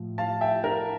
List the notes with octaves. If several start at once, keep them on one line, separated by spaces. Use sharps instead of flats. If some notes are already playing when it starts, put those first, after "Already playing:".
Already playing: A2 F3
F5 A5
E5 G5
A#4